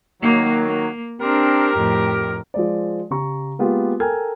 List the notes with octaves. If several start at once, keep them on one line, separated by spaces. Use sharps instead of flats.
D#3 F#3 A#3
A#3
C4 D4 G4 A#4
F2 A2
F3 G#3 D5
C#3 G4 A#5 C#6
G#3 A#3 B3 F4 G4
A4 A#4 G5 G#5 F6 G#6